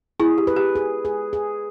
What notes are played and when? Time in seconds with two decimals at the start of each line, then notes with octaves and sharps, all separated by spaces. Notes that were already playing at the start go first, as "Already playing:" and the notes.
0.20 E4 G#4
0.38 G4
0.47 B4
0.56 G4
0.75 G#4
1.05 G#4
1.33 G#4